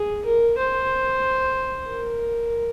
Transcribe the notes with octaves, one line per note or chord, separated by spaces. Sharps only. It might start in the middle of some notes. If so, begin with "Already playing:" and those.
Already playing: G#4
A#4
C5
A#4